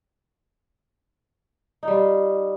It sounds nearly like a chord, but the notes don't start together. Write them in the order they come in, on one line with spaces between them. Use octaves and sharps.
D#4 G3 F4